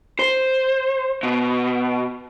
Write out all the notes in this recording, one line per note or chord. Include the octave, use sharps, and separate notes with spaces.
C5
B2